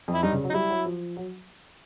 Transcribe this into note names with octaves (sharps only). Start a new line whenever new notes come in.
F2
E4
G2 D#4
C#3
F#3
D#4
G3 E4
F#3
F3
F#3